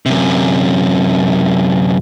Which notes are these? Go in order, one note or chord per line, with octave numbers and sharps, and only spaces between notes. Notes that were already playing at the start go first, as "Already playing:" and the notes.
F#2 C3